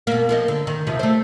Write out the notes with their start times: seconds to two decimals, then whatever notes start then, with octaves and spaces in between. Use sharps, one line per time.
0.07 B2 A#3
0.29 F3 A#3 D#5
0.48 D3
0.67 D#3
0.87 D#2 C3 F3
0.99 A3 C5